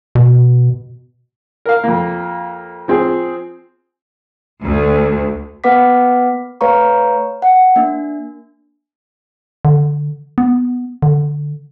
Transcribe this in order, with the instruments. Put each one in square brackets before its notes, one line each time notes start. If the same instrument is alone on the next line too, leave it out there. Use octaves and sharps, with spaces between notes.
[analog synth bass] B2
[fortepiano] A#4 F5
F2 A#3
F3 C4 G#4
[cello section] D2
[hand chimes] A#3 B3 B4 F#5 D6 B6
A3 B4 C#5 F5 A#5 C#6
F#5
A#3 D4
[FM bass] D3
B3
D3